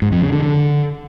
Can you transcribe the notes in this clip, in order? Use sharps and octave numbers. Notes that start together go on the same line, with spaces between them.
G#2
F2
C#3
D3
D3